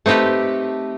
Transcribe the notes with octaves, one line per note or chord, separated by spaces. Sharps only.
A3 C4 D#4 G4 B4